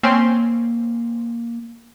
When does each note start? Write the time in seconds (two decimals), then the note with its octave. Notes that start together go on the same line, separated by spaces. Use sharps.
0.03 A#3 C4 C#4 C6